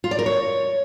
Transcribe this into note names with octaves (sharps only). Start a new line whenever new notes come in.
F4
D5
A#4
C#5